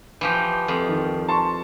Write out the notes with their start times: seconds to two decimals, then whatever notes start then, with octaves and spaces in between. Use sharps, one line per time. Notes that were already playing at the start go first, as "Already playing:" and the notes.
0.21 E3 F3 G4
0.68 F2
0.89 D#3
1.28 A5 C6 C#6